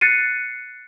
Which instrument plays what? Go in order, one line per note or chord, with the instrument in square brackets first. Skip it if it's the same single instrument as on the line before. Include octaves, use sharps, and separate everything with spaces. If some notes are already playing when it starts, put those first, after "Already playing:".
[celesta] F#6 A6 C7 C#7 D#7